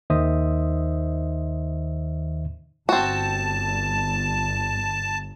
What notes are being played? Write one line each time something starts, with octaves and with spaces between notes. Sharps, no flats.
D#2 D#3 C5 D#5 E5 D#6
G1 C4 F#4 A5